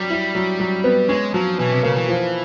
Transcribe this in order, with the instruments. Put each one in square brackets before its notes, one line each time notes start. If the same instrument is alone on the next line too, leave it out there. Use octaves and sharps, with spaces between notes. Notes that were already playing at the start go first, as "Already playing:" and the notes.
Already playing: [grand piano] F#3 [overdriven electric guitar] G3
[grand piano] E4
F#3
F#3
B3
[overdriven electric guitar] G#3 [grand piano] C#4
[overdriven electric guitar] F3 [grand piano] F#3
[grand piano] B2 [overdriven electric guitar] E3
[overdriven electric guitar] C3
[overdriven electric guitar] C#3 [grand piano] A#3
[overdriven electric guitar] E3
[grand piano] F3